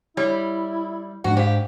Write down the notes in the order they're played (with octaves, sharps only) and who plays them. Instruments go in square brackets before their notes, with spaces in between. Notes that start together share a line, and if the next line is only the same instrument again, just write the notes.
[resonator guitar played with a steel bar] G3 [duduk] E4 [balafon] C#5
[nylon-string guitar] G#2 D4 [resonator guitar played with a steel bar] F#4
[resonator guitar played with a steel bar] G4 [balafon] C5 F5